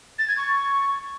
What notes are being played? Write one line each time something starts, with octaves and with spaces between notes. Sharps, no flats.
A6
G#6
C#6